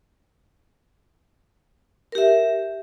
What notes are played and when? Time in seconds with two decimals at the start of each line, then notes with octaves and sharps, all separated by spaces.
2.12 A#4
2.15 G4
2.18 E5